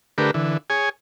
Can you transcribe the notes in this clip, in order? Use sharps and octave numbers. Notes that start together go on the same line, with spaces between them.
D3 A3 D4 G4 A#4 B4
D3 E3
G#4 C#5 G#5